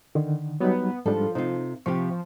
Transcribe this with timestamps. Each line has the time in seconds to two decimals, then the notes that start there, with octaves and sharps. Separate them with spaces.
0.15 D3 D#3
0.60 F#3 G3 B3 D#4
1.06 G#2 F3 G3 D4 A4
1.35 C3 D#4 F4
1.86 C3 F3 G4 C#6